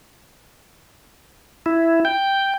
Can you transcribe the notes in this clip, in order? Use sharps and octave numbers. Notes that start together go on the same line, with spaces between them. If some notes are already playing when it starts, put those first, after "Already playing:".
E4
G5